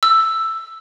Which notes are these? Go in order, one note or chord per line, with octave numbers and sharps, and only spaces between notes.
E6